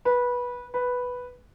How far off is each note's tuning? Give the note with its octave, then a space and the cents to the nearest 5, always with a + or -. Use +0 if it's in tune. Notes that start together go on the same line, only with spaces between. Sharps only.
B4 -15
B4 +0